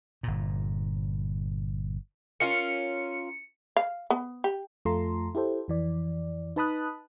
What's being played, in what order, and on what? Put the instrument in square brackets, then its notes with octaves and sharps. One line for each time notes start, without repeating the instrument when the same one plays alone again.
[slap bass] G1 A#2
[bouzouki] C#4 F4 A#4 [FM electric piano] C#7
[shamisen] F5
B3
G4
[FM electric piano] F2 A3 F4 A4 A#5 C6
E4 G4 A4 C5
F2 E3 D5
D#4 B4 A5 B5 D#6 F#6